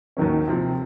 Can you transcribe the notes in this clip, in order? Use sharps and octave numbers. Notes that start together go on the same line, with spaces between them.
D#2 D#3 F#3 C#4
C3 F3 C4